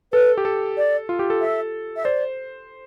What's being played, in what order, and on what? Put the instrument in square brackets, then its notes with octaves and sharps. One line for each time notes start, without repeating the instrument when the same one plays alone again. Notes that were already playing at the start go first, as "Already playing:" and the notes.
[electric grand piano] A4 [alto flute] B4
[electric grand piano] G4
A4
[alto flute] D5
[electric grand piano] F4
G4
A4
[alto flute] E5
E5
[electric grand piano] C5 [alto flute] D5